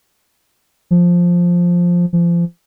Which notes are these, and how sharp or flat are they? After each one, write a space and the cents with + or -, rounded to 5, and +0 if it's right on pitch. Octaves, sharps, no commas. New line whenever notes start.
F3 +5
F3 -30